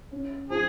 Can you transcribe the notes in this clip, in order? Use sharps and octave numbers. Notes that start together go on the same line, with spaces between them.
C#4
F3 G#4